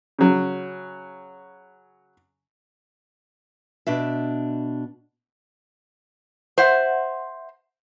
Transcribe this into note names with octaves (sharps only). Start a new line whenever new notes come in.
C#3 F#3
B2 D4 E5
C5 E5 F#5